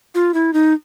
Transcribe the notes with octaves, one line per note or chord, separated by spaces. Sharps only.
F4
E4
D#4